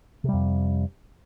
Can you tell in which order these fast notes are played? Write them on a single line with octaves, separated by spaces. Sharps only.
C3 G3 F2